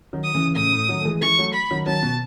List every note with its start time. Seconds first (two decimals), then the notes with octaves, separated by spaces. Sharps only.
0.13 D#3 F#3
0.24 D#6
0.34 C#3 E3
0.56 A2 C#3 D#6
0.73 A2
0.89 D#3 F#3
1.00 A3
1.05 E3 G#3
1.21 E3 G#3 C#6
1.38 F#3 A3
1.54 B5
1.71 D#3 F#3
1.86 D#3 F#3 A5
2.03 B2